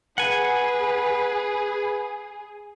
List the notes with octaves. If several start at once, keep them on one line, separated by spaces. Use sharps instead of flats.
G#4 B4 F#5 G#5